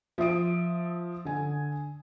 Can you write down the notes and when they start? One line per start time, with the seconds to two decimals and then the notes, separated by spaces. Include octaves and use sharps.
0.18 F3 E5 D#6 D7
1.25 D3 G#5